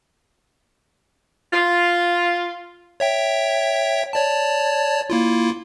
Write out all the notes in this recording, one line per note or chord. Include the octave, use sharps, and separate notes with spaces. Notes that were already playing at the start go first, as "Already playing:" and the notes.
F4
C#5 E5 G5
C#5 D5 A5
A#3 E4 F4